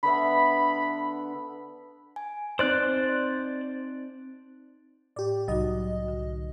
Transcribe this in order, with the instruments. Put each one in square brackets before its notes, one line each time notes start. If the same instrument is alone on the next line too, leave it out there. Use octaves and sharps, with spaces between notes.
[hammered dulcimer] D3 B3 E5 [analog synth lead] B5
[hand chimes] G#5
[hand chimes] C4 D#4 D7 [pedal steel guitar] C5 D5 F#6
[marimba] A2 [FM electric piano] G4 D5
[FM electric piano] C2 D#5 [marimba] F#3 D#4 F#4
[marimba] D3